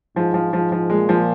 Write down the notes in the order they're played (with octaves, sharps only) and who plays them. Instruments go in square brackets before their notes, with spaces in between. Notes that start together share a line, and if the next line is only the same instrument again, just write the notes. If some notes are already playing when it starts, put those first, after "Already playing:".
[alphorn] G#2 [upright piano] F3
[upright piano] F3
[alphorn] G#2 [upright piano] F3
[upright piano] F3
[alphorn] A#2 [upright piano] G#3
[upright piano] F3